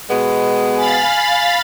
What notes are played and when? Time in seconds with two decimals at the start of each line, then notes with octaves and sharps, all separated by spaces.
0.10 B2 G#3 B3
0.76 F5 G#5 B5 A6